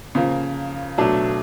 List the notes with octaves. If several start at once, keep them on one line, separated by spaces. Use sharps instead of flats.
C#3 F3 A#3
B2 F#3 A3 D4